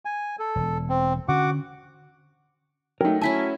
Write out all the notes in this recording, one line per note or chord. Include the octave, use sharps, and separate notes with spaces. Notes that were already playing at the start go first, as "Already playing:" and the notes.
G#5
A4
E1
C4
D3 C#4 F#4 F#5 D6
F#3 A3 D#4 A#4 G5
C#4 E4 E5 G#5 A5 B6